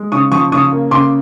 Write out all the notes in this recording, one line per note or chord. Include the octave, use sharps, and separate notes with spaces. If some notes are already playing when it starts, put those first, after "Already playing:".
Already playing: G#3
C#3 C#6 D#6
F3 C#6 D#6
C#3 C#6 D#6
A#3
C#3 C6 D6